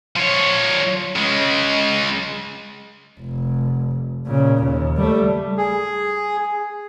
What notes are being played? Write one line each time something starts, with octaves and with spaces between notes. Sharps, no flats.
F3 C#5
C#3 G#3
F1
A#2 C#3
D#2
G3 A3
G#4